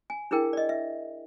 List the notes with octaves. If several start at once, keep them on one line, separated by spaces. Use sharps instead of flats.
G#5
D4 E4 G#4 A#4 G5
D5 D#5
E5